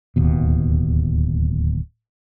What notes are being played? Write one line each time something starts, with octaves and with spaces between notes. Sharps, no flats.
D1 D#2 B2